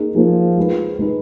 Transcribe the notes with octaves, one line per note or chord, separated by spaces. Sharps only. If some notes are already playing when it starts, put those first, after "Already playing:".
Already playing: A#3 D#4 G#4
F3 A#3 D#4 G#4
G#3 D#4 G#4 B4
G#3 D#4 G#4 B4